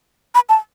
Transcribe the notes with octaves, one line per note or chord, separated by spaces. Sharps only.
B5
A5